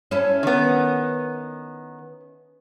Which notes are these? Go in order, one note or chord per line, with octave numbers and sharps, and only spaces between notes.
C#4 E4 A4
D#3 B3